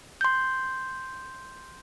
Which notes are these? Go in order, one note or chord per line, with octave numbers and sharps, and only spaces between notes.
C6 G6